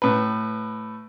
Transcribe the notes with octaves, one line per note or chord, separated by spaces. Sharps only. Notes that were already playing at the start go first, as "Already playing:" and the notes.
A2 B4